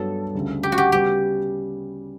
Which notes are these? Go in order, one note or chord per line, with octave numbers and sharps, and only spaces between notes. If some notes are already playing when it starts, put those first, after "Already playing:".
Already playing: G2 F#3 B3 F#4 A4 C#5
D2 C#3 G3
G4
F#4
G4
C#3 G3 B3 G4